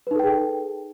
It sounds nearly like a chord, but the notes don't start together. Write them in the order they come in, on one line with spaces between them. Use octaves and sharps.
B4 D#4 A4 G5 G#4